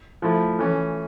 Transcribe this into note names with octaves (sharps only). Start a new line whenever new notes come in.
F3 A3 E4
E3 A3 C#4